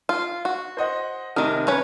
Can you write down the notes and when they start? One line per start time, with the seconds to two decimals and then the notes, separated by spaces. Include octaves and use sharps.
0.09 F4
0.45 F#4
0.77 C5 D#5 F#5
1.36 F1 C3 D#3 A#4 D#6
1.67 C#4 B4 C#5